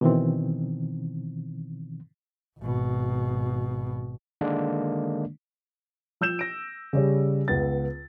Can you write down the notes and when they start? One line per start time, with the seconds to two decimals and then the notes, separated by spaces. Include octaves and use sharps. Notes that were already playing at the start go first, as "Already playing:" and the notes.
0.01 B2 D#3 E3 C4
2.59 G#1 B2
4.41 D3 D#3 G#3 A#3 D4
6.21 F3 E6 G6 E7
6.39 A#6 D7
6.93 C#3 G3 C#5
7.48 C#2 B3 A6